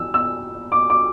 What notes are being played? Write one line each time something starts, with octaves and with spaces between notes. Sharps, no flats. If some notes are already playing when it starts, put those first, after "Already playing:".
Already playing: E3 E6
E6
D6
D6